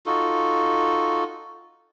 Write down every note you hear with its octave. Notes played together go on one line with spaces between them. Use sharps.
D#4 F4 F#4 A4